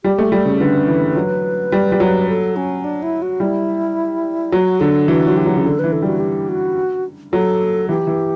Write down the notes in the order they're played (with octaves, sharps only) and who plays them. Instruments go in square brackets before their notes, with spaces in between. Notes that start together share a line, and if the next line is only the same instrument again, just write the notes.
[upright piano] G3 [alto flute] G4
[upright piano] A3
[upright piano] G3 [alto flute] A4
[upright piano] C#3
[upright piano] D3 [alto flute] B4
[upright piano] E3
F#3
G3
G3
F#3
[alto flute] A4
C#4
D4
E4
F#4
[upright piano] G3 [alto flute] E4
[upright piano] F#3 [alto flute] F#4
[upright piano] D3 [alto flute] A4
[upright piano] E3 [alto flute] F#4
[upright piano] F#3
[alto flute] G4
[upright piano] F#3
C#3
[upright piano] D3 [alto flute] A4
[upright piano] E3 [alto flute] B4
[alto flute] A4
[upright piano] G3 [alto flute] F#4
[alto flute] G4
F#4
[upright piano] F#3 [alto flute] A4
[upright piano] E3 [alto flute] G4
[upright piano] E3